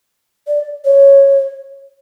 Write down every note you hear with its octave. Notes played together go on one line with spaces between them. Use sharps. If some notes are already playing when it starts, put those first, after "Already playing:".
D5
C#5